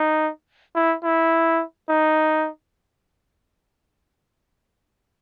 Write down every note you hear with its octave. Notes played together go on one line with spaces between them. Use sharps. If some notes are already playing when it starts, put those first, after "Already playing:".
Already playing: D#4
E4
E4
D#4